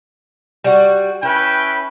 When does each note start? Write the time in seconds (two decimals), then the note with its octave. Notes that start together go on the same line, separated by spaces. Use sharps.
0.64 G3 F#4
1.23 C#4 E4 B4 G5